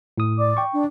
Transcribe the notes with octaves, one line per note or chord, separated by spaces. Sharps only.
A2 D#6
D5 D6
G5 C#6
D4